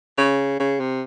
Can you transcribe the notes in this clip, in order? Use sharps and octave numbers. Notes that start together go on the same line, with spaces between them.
C#3
C#3
C3